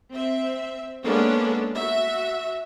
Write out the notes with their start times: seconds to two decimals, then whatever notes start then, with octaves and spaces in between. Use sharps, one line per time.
0.12 C4 E5
1.04 G#3 A#3 B3 C#4 D4 A4
1.75 F#4 E5